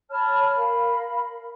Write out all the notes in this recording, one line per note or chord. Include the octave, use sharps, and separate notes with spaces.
C#5 A5 B5 F6
A#4 F5 B5